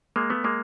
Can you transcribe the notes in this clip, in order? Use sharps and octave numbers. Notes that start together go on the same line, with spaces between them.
G#3 A#3
A3 B3
G#3 A#3